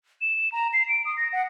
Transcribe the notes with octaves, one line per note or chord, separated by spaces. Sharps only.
E7
A#5
C7
D7
D#6
A#6
F#5